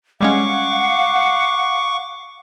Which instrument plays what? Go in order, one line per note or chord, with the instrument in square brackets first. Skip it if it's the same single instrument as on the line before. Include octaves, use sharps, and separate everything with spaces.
[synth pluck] G3 G#3 C#4 [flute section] F5 F#5 [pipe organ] C#6 D6